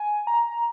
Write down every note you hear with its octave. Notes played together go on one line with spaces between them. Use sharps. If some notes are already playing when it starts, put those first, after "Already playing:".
Already playing: G#5
A#5